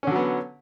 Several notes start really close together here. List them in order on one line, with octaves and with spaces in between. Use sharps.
C#4 D3 F#3 B3